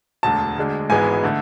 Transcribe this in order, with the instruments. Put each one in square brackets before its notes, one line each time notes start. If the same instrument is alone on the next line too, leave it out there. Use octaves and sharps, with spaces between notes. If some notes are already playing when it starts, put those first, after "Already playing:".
[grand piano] E1 D2 D3 A5
D2 D3 G#3 D4
G#1 G#2 E3 G#3 B3 G#5
D3 A3